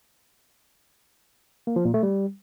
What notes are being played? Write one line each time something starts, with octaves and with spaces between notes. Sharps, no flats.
A#3
F3
A#2
A3
G3